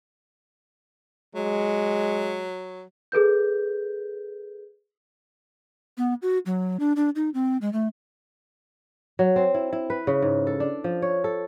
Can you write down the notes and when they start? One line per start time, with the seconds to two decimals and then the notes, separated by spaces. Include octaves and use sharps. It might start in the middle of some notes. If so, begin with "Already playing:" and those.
1.35 F#3 G#3
3.12 G#4 A4 B4 G6
5.98 B3
6.22 F#4
6.46 F#3
6.80 D4
6.96 D4
7.16 D#4
7.34 C4
7.62 G#3
7.73 A3
9.19 F#3
9.36 C4
9.54 E4
9.73 E4
9.90 B4
10.07 C#3
10.22 G#2
10.47 A4
10.60 D4
10.84 F3
11.02 C#5
11.24 A4